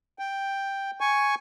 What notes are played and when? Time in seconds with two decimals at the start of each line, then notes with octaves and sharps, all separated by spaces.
0.19 G5
1.00 G#5 C#6